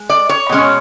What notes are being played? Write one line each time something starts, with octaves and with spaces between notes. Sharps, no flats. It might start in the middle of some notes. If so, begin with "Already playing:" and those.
Already playing: G#3
D5
C#5
B2 G#3 C#4